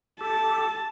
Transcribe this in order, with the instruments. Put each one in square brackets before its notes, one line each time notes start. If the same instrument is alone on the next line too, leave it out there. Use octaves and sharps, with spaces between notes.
[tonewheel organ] G4 A4 [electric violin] A5